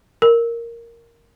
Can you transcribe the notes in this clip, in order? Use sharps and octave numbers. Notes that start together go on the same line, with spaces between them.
A#4